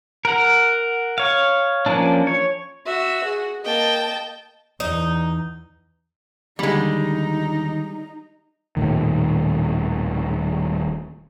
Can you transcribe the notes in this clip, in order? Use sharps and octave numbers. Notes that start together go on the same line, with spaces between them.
A#4 F#5
C#5 F5
F3 A#3 C#4 D4
C#5
F#4 E5
G#4
A#3 D#5 G5 A5
E2 D#4
D#2 D3 G3 G#3 D#4
D#1 A#1 A2 D#3